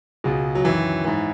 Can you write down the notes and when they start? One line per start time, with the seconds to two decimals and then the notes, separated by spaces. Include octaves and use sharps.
0.24 C#2 B2 G#3
0.55 F#3
0.64 F#2 D#3 E3
1.05 G#2 E3